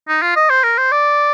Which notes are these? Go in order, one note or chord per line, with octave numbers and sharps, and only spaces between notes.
D#4
F4
D#5
C5
A#4
C5
D5